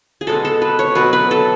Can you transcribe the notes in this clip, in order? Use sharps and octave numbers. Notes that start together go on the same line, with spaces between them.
G#4
B2 G#3 B3 A4
A4
B4
C#5
B2 F#3 B3 B4
B4
A4